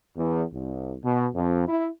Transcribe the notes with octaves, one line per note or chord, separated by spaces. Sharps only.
E2
C2
B2
F2
E4